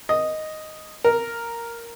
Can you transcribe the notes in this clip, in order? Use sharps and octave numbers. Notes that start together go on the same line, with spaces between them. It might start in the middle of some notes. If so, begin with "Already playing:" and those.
D#5
A#4